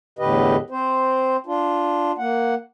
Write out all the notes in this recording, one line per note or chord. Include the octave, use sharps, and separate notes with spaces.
E2 A2 D3 G4 B4 D#5
C4 C5
D4 F4
A#3 F#5